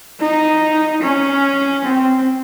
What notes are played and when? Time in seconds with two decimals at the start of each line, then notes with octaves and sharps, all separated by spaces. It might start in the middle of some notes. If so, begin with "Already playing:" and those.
0.21 D#4
1.02 C#4
1.84 C4